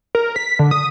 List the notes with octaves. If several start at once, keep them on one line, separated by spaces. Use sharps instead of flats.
A#4
B6
D3
D#6